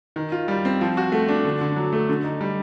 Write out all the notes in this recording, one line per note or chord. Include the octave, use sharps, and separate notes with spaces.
D#3
F4
G3
C4
F3
F#4
A3
D4
D3
D3
F#3
A3
D3
D#4
G3